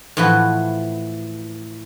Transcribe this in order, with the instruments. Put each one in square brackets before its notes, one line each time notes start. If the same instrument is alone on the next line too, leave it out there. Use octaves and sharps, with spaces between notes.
[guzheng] A2 E3 F3 F#4 B4